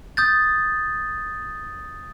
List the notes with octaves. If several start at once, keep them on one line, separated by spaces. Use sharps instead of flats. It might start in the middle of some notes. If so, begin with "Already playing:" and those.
D#6 G6 A6